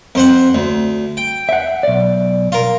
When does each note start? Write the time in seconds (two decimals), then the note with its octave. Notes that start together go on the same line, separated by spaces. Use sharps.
0.15 F2 C5 F#5
0.55 D2
1.17 G5
1.49 E5 F#5
1.83 B1 D5
2.52 F4 A#4